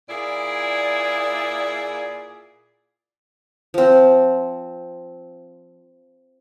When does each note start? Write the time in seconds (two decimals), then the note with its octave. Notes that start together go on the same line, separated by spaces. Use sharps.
0.09 A#2 E4 G#4 D5
3.74 F3 C4